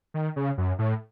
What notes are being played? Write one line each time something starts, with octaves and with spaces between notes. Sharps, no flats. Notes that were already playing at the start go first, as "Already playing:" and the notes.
D#3
C#3
F#2
A2